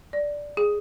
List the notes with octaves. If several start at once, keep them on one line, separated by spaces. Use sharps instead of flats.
D5
G#4